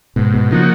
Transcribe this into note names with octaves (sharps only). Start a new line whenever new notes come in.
G#2 B2
B2
C#3 F3 A#3 D#4 F#4